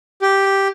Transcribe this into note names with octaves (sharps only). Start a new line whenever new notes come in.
G4